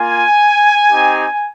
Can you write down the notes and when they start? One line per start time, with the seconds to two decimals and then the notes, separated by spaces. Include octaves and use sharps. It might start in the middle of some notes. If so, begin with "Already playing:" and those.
Already playing: A#3 F4 G#5
0.91 C4 D#4 G4